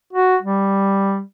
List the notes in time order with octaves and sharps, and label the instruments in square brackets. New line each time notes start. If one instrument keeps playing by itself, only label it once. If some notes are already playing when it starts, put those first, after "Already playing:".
[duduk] F#4
G3